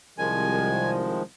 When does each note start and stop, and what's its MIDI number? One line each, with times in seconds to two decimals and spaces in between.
0.18 1.23 36
0.18 1.23 51
0.18 1.23 53
0.18 1.23 56
0.18 0.90 80